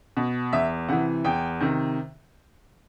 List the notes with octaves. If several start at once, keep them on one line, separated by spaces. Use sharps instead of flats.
B2
E2 E5
C3 E3 F#5
E2 G5
C3 D#3